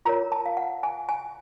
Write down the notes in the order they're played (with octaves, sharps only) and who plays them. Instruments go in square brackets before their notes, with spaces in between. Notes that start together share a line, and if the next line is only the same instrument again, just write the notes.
[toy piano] F4 A#4 C#5 A#5
A5
F5
F#5
G#5
G#5